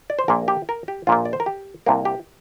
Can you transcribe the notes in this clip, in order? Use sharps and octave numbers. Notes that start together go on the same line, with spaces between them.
D5
C5
A#1 A#2 A#3 A#4
G4
A#4
G4
A#1 A#2 A#3 F4
D5
C5
A#4
G4
C2 C3 A#3 A#4
G4